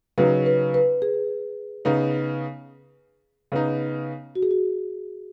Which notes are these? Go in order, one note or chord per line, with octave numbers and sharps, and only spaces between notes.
C#3 F#3 D#4 B4
B4
B4
G#4
C#3 B3 D#4
C#3 B3 D#4
F#4
G#4
F#4